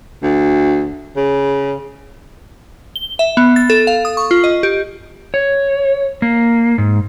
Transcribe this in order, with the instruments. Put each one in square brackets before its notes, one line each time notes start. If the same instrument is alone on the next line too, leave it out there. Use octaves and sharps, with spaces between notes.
[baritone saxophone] D2
C#3
[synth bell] G7
E5
B3
A6
A4
F5
D#6
C#6
F4
D#5
G4
[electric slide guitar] C#5
A#3
G#2